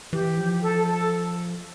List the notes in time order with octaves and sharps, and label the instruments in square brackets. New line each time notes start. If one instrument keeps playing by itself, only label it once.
[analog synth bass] E3 [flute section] G4
[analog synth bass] F3
[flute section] A4
A4